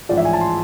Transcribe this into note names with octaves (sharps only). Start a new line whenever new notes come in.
A1 G#2 F3 D5
E5
G#5
A5
C6